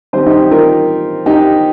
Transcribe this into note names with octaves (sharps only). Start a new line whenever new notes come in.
D#3 G3 C4 G4 C5
D#4 G4
F4 A#4
D#4 G4